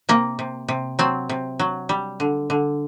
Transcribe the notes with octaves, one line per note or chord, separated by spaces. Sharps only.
C3 A#3
C3
C3
F#3 C4
C3
F#3
G3
D3
D3